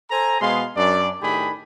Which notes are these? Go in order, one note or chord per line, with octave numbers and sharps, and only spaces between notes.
A4 C5 G#5 A#5
B2 G#3 B3 G#4 F5 C6
F#2 D4 D5
A2 D#3 D4 G4 G#4 B5